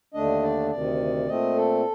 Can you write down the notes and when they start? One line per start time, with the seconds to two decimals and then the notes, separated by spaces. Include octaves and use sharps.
0.14 D#2 D3 A3 D4 D#5
0.42 D5
0.71 D2 C3 D#3 D5
1.28 A#2 A3 C4 D#5
1.55 A4